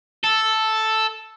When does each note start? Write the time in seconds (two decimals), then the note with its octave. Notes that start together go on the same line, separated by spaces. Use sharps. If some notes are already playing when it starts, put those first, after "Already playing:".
0.24 A4